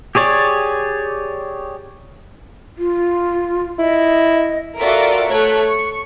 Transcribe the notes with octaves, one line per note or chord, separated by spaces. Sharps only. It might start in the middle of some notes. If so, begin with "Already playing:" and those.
G4 G#4 C#5 D5
F4
E4 D#5
F4 F#4 A4 A#4 D5 E5
A3 C#5 F#6
C#6